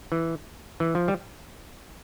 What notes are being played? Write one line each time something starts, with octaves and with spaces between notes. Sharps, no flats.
E3
E3
F3
G3